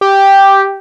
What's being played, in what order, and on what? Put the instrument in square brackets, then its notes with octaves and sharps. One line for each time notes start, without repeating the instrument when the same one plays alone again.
[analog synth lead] G4